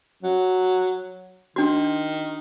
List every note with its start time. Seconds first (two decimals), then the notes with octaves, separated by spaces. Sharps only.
0.23 F#3
1.56 D#3 D4 F#4